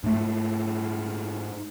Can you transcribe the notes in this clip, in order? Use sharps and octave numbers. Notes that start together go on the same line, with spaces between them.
G#2 A3